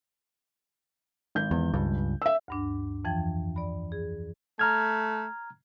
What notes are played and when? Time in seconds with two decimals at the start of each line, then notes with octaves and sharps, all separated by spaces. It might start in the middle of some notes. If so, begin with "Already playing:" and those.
1.35 G#1 G6
1.51 E2
1.73 C#2 G2
2.22 E5 E6
2.48 D2 G2 D4
3.05 F2 E3 F3 G5
3.56 D5 B5
3.92 G#4
4.59 A3 A#5 F6 G#6